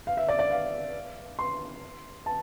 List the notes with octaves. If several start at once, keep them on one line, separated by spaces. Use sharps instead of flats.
F5
E5
D5
D5
F5
C6
A5